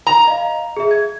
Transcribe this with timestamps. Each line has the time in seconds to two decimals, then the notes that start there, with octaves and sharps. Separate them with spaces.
0.07 A#5
0.27 D#5 F5
0.77 G#4 E5
0.91 G#6